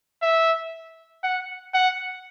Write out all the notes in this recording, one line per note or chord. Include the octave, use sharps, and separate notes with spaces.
E5
F#5
F#5